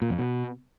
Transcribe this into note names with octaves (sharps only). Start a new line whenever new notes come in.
A#2
F2
B2